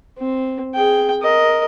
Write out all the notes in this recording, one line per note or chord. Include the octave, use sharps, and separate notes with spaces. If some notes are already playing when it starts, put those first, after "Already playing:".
C4
G#4 G5
A#4 D#5